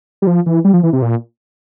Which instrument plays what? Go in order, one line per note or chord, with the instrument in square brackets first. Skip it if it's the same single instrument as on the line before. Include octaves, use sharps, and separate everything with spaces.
[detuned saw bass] G3
F3
E3
G3
F3
E3
C3
A#2